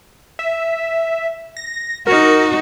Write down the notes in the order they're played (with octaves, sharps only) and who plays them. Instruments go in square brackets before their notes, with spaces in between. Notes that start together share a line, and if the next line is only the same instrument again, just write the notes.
[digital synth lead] E5
A#6
[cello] D#4 F#4 [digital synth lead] A#4